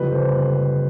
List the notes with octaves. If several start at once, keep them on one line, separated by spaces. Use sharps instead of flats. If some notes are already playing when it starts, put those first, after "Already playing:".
Already playing: F#1 F2 D3 G3 B4
C5